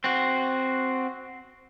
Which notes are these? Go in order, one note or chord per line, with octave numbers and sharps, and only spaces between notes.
C4 F#4